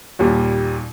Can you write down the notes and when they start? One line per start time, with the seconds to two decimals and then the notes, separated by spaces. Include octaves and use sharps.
0.19 D#2 A#2 G3